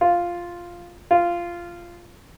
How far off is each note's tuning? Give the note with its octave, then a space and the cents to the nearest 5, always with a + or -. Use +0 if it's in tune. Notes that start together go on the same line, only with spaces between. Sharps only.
F4 +0
F4 -10